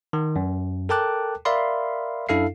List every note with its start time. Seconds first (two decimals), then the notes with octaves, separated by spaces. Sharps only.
0.13 D#3
0.36 F#2
0.89 A4 A#4 G5 A5 D6 F#6
1.45 A#4 D5 E5 F5 B5 C6
2.29 F#2 D4 E4 A4 F5 C7